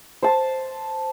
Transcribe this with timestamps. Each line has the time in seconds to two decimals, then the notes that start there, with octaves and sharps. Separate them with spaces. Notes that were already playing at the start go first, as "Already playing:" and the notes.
0.23 C5 A5